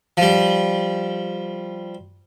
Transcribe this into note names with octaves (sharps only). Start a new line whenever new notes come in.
F3 G3